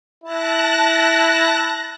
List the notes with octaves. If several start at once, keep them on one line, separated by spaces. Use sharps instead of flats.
E4 A5 F#6 A#6